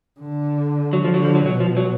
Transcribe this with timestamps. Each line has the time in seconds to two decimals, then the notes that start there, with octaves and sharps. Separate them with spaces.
0.20 D3
0.93 F#3
1.04 F3
1.14 D3 F#3
1.24 F3
1.35 F#3
1.46 B2 F#3
1.60 F3
1.77 F#3